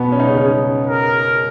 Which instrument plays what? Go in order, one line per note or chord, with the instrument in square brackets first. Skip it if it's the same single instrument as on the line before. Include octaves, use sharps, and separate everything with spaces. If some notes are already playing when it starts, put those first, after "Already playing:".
Already playing: [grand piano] B2 B3
C#4
D#4
C#3 C#4
C#3 C#4
[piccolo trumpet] A#4